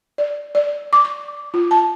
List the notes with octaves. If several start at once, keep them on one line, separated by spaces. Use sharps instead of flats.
D5
D5
D6
C#6
F4
A5